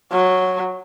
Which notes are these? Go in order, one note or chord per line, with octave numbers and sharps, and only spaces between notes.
F#3